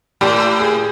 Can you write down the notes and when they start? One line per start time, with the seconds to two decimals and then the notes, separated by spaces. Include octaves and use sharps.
0.21 A2 G4
0.61 G#4